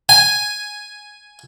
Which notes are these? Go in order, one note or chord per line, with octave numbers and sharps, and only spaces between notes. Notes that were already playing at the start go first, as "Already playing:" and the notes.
G#5